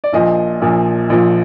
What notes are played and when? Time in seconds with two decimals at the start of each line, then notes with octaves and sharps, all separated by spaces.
0.04 D5
0.13 A#1 A#2 F3 D#5
0.61 A#1 A#2 F3
1.10 A#1 A#2 F3